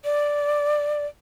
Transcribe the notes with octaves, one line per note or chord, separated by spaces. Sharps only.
D5